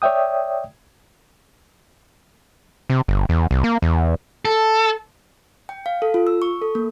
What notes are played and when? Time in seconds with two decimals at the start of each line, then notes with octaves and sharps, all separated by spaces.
0.02 C#5 D5 E5 G5 D#6
2.90 C3
3.08 G1
3.29 E2
3.51 C2
3.64 A#3
3.82 E2
4.45 A4
5.69 G5
5.86 F5
6.02 A4
6.14 F4
6.27 E6
6.42 C#6
6.62 A4
6.75 A#3